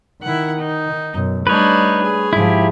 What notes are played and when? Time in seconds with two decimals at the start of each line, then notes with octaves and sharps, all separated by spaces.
0.22 D#3 E4 F#5
0.58 D#4
1.14 F#2 B2
1.47 G3 A3 D4 D#4 B4 C#5
2.03 G#4
2.33 G#2 F3 E4 G4